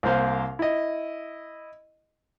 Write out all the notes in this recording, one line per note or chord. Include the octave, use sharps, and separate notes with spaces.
C2 A#3 C5 F5
E4 D#5